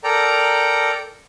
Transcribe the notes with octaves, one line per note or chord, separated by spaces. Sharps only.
A4 A#4 D5 G5 A#5